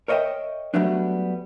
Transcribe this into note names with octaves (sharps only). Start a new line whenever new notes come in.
A#4 C#5 D#5 E5 G5
F#3 G3 A3 B3 D4